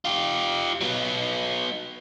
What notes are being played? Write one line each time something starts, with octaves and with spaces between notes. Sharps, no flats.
F4 G4
F#3 B3